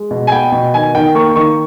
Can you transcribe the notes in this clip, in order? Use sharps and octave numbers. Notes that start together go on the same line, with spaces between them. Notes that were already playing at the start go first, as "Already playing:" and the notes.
Already playing: G#3
B2
G#5
B3 G5
B2
D#3 G#5
D#3 G5
A#3 C#6
D#3 C#6